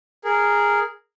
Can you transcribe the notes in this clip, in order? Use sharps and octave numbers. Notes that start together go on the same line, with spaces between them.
G#4 A#4